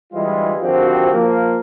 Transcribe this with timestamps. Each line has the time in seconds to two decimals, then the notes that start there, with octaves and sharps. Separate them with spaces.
0.13 D2 E3 G3 G#3 F4
0.60 G#1 D3 F3 C4 F#4 G4
1.12 F3 A#3